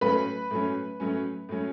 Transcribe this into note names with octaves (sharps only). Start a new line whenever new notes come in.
A2 F#3 C#4 B4 B5
A2 F#3 C#4
A2 F#3 C#4
A2 F#3 C#4